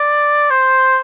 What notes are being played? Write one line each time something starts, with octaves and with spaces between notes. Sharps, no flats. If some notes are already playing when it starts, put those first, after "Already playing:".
Already playing: D5
C5